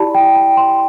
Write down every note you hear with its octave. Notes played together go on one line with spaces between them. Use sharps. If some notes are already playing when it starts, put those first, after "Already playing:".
Already playing: E4 G4 D5 A5 B5
G5
G5
C6